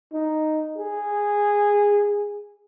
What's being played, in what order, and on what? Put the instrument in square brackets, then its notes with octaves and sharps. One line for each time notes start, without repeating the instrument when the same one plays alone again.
[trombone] D#4
G#4